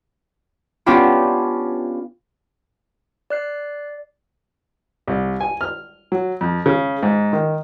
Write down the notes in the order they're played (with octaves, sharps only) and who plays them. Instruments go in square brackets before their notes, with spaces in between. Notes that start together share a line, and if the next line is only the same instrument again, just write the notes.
[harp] B3 C#4 D4 F4 G4
[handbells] D5 F#6 C7
[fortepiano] C2
G#5
F6
F#3
F2
C#3
G#2
D#3